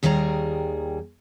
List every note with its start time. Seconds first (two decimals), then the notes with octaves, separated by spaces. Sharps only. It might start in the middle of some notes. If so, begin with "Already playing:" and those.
0.03 D#2 D#3 G3 G#4 A#5